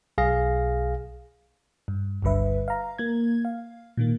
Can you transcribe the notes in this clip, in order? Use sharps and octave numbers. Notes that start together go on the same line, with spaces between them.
B1 G#4 F5 A#6
G2
G1 C#2 G2 D3 B4 E5
F5 A#5
A#3 G#6
F5
A#2 D#3 A#3